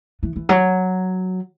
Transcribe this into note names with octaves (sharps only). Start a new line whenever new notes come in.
E3
E3
F#3